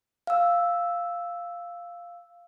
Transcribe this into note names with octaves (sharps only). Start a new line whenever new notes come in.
F5 E6